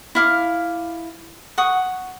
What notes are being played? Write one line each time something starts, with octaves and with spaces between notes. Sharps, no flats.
E4 F5 D6
F#5 C#6 D#6